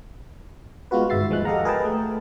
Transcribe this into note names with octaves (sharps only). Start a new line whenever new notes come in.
G#3 B3 F4 F#4 B4
G1 G#2 F#4 E5 A6 C7
D#2 F3 G#3 F#6
G4 A4 D#5 F5 F#5 A#5
G#4 A#4 B4 D#5 G5 A5
A3